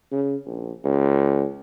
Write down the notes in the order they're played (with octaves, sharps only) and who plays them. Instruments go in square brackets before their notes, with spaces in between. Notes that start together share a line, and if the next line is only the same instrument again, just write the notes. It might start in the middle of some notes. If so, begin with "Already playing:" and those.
[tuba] C#3
A#1
C#2